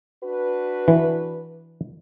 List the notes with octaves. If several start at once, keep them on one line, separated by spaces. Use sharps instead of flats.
D4 F#4 B4
E3